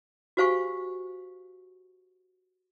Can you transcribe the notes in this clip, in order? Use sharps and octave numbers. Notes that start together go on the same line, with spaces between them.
F#4 G4 C5 F5 G#5 C#6